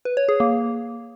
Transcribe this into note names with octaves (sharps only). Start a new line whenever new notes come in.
B4
C#5
G#4
A#3